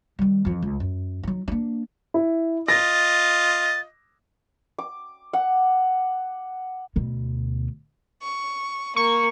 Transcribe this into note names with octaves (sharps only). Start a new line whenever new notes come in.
D#3 G3
F2 E3
C#2
F#2
F#3 D#4
A#3 D4
E4
F4 D#5 A6 A#6
D6
F#5
D2 B2
C#6
A#3 C#6